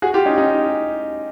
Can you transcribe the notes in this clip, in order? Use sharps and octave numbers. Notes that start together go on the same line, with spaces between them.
F#4 G#4
F4 G4
C#4 D#4
C#4 D#4